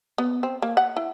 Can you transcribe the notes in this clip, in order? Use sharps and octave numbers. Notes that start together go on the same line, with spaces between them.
B3
C4
A#3
F#5
E4